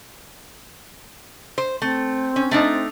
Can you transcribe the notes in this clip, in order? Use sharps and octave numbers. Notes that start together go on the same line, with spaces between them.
C5
A3 C4
C#4
A3 D4 D#4